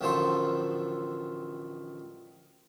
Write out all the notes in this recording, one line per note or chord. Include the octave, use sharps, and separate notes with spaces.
A1 D2 D#3 F3 A4 C6